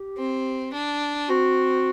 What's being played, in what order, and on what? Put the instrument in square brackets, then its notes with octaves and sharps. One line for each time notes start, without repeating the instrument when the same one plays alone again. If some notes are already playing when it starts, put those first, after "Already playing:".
Already playing: [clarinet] G4
[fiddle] C4
D4
[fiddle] C4 [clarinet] F#4